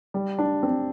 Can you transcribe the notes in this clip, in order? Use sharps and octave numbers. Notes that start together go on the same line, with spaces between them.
G3
D4
C4